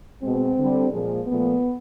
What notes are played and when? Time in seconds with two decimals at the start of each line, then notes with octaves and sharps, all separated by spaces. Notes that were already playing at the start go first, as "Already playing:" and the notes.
0.23 B2 G#3 C4
0.58 D3 G3
0.93 A#2 F3 G#3
1.27 A#2 F3 A3 B3